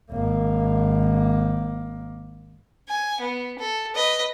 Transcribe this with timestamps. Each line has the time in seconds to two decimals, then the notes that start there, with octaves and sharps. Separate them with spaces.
0.12 G#1 A#3
2.89 G#5
3.20 B3
3.59 A4
3.95 B4 D#5